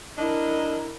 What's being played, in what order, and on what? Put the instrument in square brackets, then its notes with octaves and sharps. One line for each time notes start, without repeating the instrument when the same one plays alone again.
[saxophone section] D4 D#5 [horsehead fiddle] E4 A#4